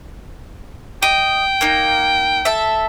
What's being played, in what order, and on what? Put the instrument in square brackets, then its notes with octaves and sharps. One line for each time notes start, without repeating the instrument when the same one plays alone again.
[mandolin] D#5 [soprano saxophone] G5
[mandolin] A#3 D#4
A4 E5